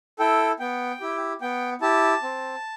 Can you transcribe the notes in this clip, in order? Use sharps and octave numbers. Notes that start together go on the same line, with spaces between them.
E4 A4 G5
B3 G5
E4 G4
B3 G5
E4 G4 A5
C4